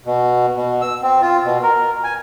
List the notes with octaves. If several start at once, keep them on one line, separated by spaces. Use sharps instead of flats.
B2
B2
E6
C4
F4
B2
A#4
G#5